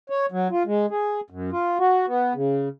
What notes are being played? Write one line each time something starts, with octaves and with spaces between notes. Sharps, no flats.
C#5
F#3
F4
G#3
G#4
F#2
F4
F#4
B3
C#3